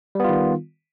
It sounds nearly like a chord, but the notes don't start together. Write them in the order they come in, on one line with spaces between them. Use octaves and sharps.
G3 B3 F4 D#3